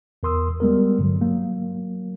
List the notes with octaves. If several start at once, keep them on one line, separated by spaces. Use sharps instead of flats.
E2 A#4 C6 D#6 E6
G3 G#3 B3 A#4
G2 D3 F#3
F#3 A#3